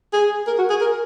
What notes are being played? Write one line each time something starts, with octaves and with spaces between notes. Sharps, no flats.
G#4
A#4
F#4
G#4
A#4